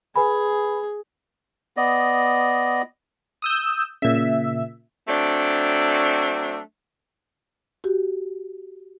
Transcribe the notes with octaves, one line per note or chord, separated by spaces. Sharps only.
G#4 B4 G#5 B5
B3 D5 D#5
D#6 E6 G6
A#2 C#3 E5
F#3 A3 C4 D4
F#4 G4